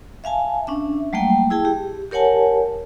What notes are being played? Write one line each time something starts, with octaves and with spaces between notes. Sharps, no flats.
E5 F5 G#5 A5
C#4 D4 E5
F#3 G3 A3 A#3 G5
E4 G#4 G5 A5
G4
G4 A#4 C#5 F#5 G#5 A5